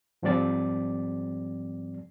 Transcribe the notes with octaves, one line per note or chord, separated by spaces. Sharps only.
G#2 F3 G3 C4 D5 A6